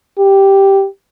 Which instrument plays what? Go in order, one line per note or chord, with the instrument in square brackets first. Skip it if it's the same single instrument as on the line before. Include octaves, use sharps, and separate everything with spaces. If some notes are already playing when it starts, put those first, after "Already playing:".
[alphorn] G4